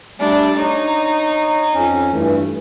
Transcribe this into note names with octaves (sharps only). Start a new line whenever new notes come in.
G3 A3 D4
D#4 C#5
F2 C#4
G2 E3 A3